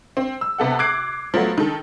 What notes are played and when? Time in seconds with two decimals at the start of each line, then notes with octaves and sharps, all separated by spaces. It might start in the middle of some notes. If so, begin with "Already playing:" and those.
0.17 C4
0.41 E6
0.58 C3 B3 A4 F#5
0.79 D6 F#6 G#6 C7 D7
1.34 F3 F#3 A3 B3
1.58 D#3 A4